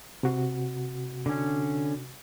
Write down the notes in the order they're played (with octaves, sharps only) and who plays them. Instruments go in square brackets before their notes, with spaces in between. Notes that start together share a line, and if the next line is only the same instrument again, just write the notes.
[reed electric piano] C3 F#4
[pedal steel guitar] D3 C#4